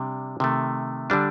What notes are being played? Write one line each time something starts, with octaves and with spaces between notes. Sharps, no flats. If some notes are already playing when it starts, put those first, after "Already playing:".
Already playing: C3 G3 D4
C3 D#3 A3
D3 G3 D4